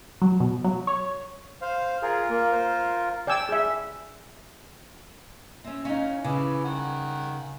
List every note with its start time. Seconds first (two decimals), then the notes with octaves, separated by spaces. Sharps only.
0.22 F#3
0.40 B2
0.64 F#3
0.87 C#5
1.61 C5 F5
2.02 F4 G#4 A#4
2.29 A#3
2.52 C5
3.27 D5 G5 G#5 E6
3.49 G#4 E5
5.64 C4 C#4 E5
5.85 C#4 D#4 F5 G#5
6.24 C#3 E3 B4 D6
6.64 D#3 F#5